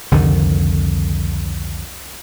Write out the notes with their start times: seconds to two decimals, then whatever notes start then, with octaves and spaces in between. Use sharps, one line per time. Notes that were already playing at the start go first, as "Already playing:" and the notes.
0.12 C2 F2 D3 D#3